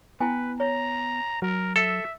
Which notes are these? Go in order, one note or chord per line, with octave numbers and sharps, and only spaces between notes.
B3 E4 B4 G5 G#5
C#5 A#5
F#3 A#4
A4 E5